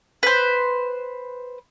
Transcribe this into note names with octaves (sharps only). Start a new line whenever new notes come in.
B4 C5